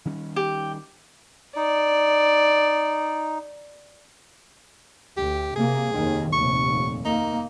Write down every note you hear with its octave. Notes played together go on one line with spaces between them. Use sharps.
D#3 G3 C#4
G4
D#4 D5
D2 G4
C3 A#3 G#4
F1 D#2 D#3
F1 D#2 A#2 C#6
A#3 D#4